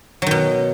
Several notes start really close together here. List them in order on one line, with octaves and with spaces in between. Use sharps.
F#3 D#3 B2